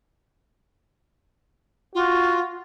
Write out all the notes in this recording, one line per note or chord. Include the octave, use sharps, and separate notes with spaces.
F4 F#4